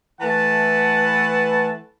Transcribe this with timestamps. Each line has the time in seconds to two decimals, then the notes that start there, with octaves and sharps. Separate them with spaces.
0.21 E3 A3 B4 F#5 A5